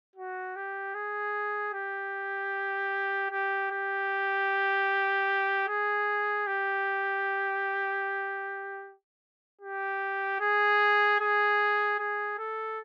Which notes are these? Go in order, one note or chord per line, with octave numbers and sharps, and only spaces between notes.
F#4
G4
G#4
G4
G4
G4
G#4
G4
G4
G#4
G#4
G#4
A4